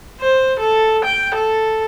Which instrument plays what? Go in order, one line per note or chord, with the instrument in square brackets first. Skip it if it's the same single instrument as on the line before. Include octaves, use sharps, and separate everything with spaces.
[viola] C5
A4
G5
A4